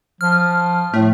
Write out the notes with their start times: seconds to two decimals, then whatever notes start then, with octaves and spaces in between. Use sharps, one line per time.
0.21 F3 F6
0.94 A2 A3